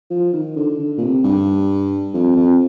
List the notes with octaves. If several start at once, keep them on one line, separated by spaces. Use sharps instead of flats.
F3
D#3
D3
D3
A#2
C3
G2
F2
F2